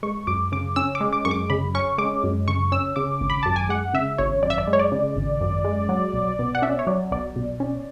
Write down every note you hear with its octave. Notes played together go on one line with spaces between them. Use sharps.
G#3 C#6
F#2 D6
C#3 D6
C#4 E6
D6
G#3
D6
F#2 C#6
D6
C#3 B5
C#4 C#6
G#3 D6
F#2
C#3 C#6
C#4 E6
C#3 D6
G#1
B5
F#2 A5
G#5
G#3 F#5
C#3 E5
G#1 C#5
F#2 D5
E5
D5
G#3
C#5
D5
C#3
G#1
F#2
G#3
F#3
B1
B2
F#5
C#4 E5
C#5
F#3 D5
B1 D5
B2
C#4